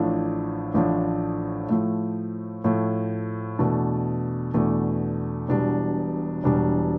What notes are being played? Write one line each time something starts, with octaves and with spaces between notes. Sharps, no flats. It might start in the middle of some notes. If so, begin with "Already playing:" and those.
Already playing: A1 A2 F3 A3 D4
A1 A2 F3 A3 D4
A2 F3 A3
A2 F3 A3
E2 B2 A3 D4
E2 B2 A3 D4
E1 E2 B2 G3 D4
E1 E2 B2 G3 D4